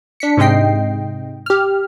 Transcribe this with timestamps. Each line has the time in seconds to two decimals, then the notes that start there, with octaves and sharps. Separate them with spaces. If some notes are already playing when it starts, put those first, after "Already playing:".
0.20 D4 B6 C#7
0.37 G#2 C3 G#3 D#5 G5 C7
1.46 G4 F6